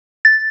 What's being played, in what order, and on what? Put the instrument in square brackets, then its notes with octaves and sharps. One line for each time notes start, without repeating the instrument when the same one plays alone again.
[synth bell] A6